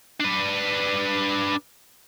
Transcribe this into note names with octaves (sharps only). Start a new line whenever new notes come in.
D4 B4